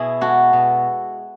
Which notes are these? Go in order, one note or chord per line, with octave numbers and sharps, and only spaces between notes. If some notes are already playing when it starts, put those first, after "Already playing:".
Already playing: B2 E4 G#4
G#3 F#4 A4
B2